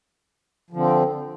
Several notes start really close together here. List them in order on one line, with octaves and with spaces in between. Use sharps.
F3 D3 C4